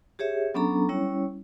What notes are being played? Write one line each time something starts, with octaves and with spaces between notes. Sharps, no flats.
G4 G#4 C#5 E5
F#3 B3 C#4 D4 A4 A#5
G3 C#4 E4 C#5